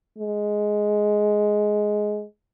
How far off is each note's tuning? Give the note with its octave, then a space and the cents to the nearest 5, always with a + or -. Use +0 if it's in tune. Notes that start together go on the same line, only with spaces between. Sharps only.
G#3 +10